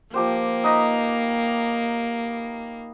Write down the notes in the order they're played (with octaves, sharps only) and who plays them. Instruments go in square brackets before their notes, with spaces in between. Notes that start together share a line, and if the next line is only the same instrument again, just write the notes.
[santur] F3 G4 C5 [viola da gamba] A#3
[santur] D#4 B4 D#5